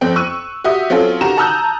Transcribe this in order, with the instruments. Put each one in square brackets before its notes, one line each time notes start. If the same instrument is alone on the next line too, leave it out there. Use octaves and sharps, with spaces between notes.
[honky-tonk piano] F2 C4 G5
C#6 E6 F#6 D#7
F#4 G4 E5 D#6
F#3 C4 C#4 F4 A4
D#3 F#4 G4 A#5 E7
A5 A#5 D#6 E6 F#6 G6